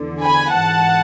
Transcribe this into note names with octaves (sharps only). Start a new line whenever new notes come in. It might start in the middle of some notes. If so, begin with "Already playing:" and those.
Already playing: E2 D3
G#5 B5
G#2 E3 F#5 A5